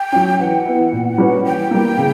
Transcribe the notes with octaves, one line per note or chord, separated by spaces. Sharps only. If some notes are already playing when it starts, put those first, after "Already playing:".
Already playing: G5
F#3 C#4
E3 F#5
B3 E4
A#2
G3 C#4 F#4 B4
E3 G5
G3 A#3
C#3